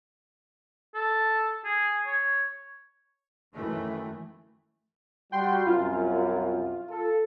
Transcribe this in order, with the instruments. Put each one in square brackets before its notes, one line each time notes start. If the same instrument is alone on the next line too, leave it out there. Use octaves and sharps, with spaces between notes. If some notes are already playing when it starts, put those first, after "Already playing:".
[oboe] A4
G#4
C#5
[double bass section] F#2 D#3 E3 A3
[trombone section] G3 F#4 [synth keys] G5 C6 G6
[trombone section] C2 F#2 [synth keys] F4
[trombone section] A4